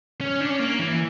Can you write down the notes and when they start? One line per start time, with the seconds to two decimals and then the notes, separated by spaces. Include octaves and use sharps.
0.21 C#4
0.40 D4
0.50 C#4
0.59 A#3
0.79 E3